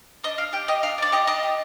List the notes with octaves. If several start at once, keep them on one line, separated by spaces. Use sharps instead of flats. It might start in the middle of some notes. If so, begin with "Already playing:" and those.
D4 D#5
D4 F5
G4 G5
G4 D#5
D4 F5
D4 D5
G4 D#5
D4 D#5
G4